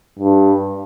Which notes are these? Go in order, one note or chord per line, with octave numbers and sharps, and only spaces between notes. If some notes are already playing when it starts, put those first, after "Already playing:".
G2